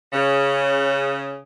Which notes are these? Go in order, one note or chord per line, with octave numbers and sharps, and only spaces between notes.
C#3